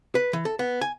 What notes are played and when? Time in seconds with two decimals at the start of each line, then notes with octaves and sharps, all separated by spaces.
0.15 B4
0.33 E3
0.45 A4
0.59 B3
0.81 G#5